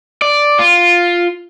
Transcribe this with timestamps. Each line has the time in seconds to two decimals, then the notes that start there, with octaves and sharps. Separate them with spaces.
0.22 D5
0.59 F4